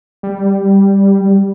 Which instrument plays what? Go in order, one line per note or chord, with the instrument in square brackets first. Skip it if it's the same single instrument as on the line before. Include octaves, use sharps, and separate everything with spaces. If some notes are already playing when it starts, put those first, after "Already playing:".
[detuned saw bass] G3